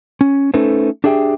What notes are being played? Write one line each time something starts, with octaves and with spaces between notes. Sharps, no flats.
C#4
A3 C#4 D#4 A4 B4 C5
D4 G4 G#4 E5 G5